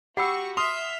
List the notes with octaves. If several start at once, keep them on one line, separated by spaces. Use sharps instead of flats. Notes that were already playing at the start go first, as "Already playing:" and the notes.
F#4 G4 F#5 B5 C#6 E6
E5 C6 D#6 F6 C7 F7